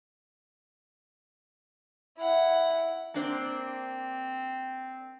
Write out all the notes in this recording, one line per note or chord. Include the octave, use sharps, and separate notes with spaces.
E4 F#5
A#3 C4 D4 C5